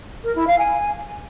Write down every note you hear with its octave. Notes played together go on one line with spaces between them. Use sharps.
A#4
E4
F5
G#5